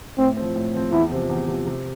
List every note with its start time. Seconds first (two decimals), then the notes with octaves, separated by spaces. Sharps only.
0.18 A2 C4
0.37 F3 C4
0.56 A2
0.74 F3 C4
0.92 E2 E4
1.12 C3 F3
1.30 E2
1.48 C3 F3
1.67 C3